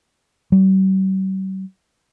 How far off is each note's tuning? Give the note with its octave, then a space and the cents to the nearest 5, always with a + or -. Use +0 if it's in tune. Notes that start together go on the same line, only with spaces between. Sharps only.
G3 -45